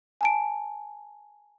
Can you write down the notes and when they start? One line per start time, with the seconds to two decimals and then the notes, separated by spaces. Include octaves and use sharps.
0.21 G#5 A5 D7